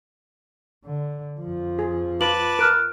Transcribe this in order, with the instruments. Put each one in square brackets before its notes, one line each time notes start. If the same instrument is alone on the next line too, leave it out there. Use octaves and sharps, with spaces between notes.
[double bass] D3
F2 F3
[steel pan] G#4
[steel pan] F4 [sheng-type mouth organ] B4 A5 D6 [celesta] F#7
[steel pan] A#4 [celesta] F6 F#6 D7